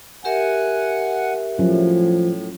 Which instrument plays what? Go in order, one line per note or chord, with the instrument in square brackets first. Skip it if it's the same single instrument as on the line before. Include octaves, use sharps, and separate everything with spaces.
[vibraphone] G4 A#4 E5 [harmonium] F#5 G#5
[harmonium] A2 [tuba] F3 [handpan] F#3 C#4